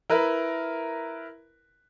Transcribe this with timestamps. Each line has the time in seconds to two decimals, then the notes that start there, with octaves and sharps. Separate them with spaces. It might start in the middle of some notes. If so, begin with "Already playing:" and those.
0.10 E4 A#4 B4